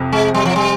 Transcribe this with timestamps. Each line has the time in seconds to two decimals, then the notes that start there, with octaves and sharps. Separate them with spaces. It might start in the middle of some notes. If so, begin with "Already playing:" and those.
Already playing: F2 C3 C4
0.12 G#3
0.34 G3
0.45 F3
0.56 G3